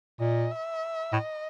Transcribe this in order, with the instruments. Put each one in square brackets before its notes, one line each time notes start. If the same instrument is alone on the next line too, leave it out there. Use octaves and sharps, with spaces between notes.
[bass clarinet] A#2 [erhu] D#5
[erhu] E5
[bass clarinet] A2 [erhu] D#5